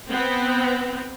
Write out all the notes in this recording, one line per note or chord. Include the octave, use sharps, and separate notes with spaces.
B3 C4